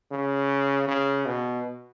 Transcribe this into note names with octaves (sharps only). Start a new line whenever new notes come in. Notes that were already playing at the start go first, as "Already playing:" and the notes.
C#3
C#3
B2